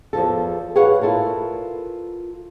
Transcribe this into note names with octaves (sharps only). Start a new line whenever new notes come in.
E2 F3 A4
G#4 B4 C#5 F5 F#5
E4 F4 A4 A#4